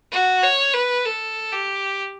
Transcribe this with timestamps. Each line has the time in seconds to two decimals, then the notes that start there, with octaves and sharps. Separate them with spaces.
0.11 F#4
0.43 C#5
0.74 B4
1.05 A4
1.53 G4